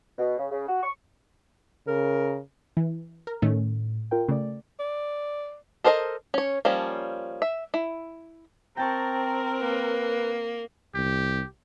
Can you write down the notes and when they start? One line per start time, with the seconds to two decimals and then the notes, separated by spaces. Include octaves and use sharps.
0.17 B2
0.37 C#3
0.51 C#3
0.67 F#4
0.82 C#6
1.87 C#3 A#4
2.77 E3
3.27 A#4
3.42 A2 D#3 A3 C#4
4.11 F4 A#4 G5
4.29 C#3 A3 D5
4.80 D5
5.84 A4 A#4 C5 D5 D#5
6.34 C#4 C#5
6.65 F3 G3 A#3 C#4
7.42 E5
7.74 E4
8.77 C4 A#4 G5 A5 A#5 C#6
9.61 A#3 B4
10.95 C2 G4